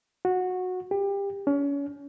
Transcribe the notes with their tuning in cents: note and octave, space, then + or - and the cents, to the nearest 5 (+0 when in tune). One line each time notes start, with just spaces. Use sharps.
F#4 -15
G4 +25
C#4 +35